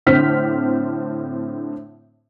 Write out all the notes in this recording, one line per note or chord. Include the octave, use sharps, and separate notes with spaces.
A2 D3 C4 F6 G6 B6